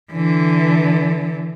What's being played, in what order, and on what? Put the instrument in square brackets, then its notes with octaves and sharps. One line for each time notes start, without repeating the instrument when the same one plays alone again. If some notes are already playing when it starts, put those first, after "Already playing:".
[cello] D3 E3